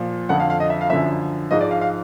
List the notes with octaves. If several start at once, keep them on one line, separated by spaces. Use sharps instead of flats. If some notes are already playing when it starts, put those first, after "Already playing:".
Already playing: A#2 F3
F2 D3 F3 F#5
F5
F5
D#5
E5
F5
F#2 D3 F3 E5
G#2 F3 D#5
D5
F5
F5